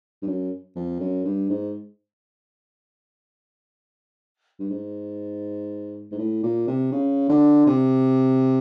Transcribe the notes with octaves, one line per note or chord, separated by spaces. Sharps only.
G2
F#2
F2
F#2
G2
G#2
G2
G#2
G#2
A2
A#2
C3
C#3
D3
C3